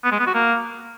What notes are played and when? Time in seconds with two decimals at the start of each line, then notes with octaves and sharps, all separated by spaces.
0.05 B3
0.12 G#3
0.19 B3
0.27 F#4
0.34 A#3